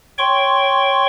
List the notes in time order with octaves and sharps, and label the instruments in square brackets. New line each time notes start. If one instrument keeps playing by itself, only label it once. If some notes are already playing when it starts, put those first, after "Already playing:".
[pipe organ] C#5 G5 C6 C#6